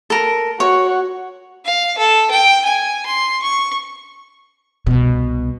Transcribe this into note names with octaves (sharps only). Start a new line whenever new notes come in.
A4 A#4
F#4 C#5
F5
A4
G5
G#5
C6
C#6
C2 B2